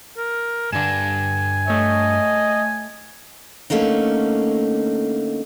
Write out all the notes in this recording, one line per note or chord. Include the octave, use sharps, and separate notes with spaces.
A#4
G2 D3 D4 G#5 A#6 E7
A3 C#5 D#5
D3 A3 A#3 C#4 D#4